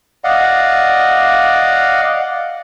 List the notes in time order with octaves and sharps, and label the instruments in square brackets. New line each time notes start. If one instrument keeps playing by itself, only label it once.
[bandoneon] D5 D#5 F5 F#5